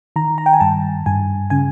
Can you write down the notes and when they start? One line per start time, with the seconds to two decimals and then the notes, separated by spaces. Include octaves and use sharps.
0.16 D#3 A#5
0.38 A#5
0.46 G5
0.53 G#5
0.60 G2 A5
1.06 G2 G#5
1.50 C#3 G#5